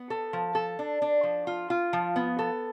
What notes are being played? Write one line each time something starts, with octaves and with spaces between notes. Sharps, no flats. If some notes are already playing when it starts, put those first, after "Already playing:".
Already playing: B3
A4
F3
A4
D4
D4
F3
F4
F4
F3
B3
A4